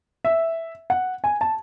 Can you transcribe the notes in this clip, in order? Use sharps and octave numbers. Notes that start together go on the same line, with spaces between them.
E5
F#5
G#5
A5